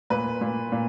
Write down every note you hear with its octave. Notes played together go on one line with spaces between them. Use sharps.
A#2 B4
A#2
A#2